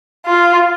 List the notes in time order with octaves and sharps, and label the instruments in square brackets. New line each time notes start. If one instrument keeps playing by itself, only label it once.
[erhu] F4